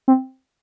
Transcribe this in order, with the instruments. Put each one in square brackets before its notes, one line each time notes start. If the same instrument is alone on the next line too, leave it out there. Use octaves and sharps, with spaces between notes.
[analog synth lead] C4